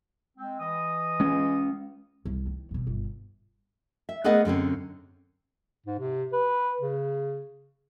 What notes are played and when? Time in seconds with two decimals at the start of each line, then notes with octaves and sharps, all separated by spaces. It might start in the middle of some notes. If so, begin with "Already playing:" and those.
0.37 G#3 C4
0.60 E3 D#5 D#6
1.20 G#3 C#4
2.25 C2
2.47 D#3
2.71 D#1 B2
2.87 G1
4.09 E5
4.24 A3 B3 G#4 A#4 D#5 F#5
4.45 F#2 D3 C4 C#4
5.86 G#2
5.99 C3
6.33 B4
6.80 C#3